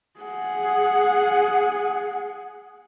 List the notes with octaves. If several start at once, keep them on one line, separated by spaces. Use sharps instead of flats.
G#4 F#5